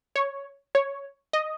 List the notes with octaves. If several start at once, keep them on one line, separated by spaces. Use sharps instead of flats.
C#5
C#5
D#5